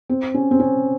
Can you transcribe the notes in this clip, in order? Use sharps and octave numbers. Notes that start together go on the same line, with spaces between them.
C4
C#4
C4
C#4